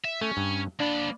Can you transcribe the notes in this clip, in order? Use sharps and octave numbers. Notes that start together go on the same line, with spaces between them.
E5
A3 C#4
G2
A#3 D4 B5